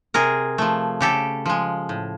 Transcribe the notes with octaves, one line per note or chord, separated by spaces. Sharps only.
C3 G#4 A#4
F3 A3
C#3 G4 A4
F3 G#3
A2